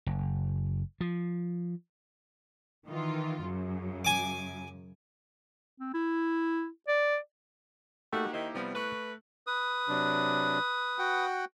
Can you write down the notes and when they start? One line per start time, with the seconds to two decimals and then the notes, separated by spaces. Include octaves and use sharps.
0.06 F#1
1.01 F3
2.88 D#3 E3 F4
3.43 F#2 C#3
4.05 G#5 D6
5.80 C4
5.94 E4
6.88 D5
8.13 A3 A#3 D#4 F#4 G4
8.33 D#3 E4 C5
8.55 C3 F3 G3 B3
8.75 A3 B4 C#6 F#6
9.47 B4 D#6
9.89 C3 F#3 D4
10.99 F#4 F#5 G5